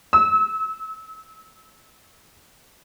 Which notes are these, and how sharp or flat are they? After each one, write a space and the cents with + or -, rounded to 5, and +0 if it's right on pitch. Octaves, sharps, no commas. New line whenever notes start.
E6 -30